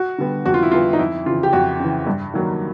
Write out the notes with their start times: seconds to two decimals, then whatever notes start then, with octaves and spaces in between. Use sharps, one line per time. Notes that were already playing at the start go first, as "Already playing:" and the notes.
Already playing: F#4
0.18 D3 G3 B3
0.46 F2 F#4
0.54 F4
0.63 E4
0.71 D3 G3 B3 F4
0.93 D#4
0.99 F2 E4
1.26 C#3 E3 F4
1.43 G4
1.53 F2 F#4
1.80 C#3 E3
2.07 G2
2.34 D#3 F#3 A#3